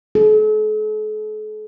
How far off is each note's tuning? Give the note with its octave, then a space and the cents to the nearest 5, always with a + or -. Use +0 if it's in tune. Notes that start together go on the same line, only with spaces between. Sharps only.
A4 -45